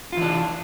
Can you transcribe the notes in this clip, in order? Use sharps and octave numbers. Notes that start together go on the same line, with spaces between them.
E3 D4 F4